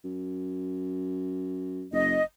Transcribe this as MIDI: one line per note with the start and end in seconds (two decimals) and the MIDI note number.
0.04 1.86 42
1.92 2.18 30
1.92 2.22 75